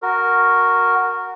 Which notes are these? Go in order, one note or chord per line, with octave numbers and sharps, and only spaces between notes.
F#4 A#4